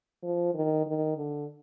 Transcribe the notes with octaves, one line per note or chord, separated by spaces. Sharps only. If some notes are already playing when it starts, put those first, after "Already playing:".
F3
D#3
D#3
D3